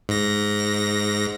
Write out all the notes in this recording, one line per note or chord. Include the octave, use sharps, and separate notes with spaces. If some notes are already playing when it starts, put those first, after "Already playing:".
G#2 A#6